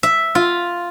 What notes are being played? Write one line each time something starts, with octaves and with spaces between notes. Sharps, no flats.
E5
F4